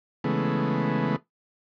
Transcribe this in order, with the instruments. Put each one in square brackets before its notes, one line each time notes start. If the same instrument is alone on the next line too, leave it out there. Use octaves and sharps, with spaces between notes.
[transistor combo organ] C#3 E3 G#3 A3 B3